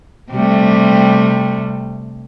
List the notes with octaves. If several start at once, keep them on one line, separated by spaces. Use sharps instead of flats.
C3 G3 A3